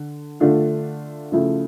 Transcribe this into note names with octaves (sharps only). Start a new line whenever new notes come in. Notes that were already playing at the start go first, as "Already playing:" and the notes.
Already playing: D3
D3 A3 D4 F4
C#3 F3 A3 E4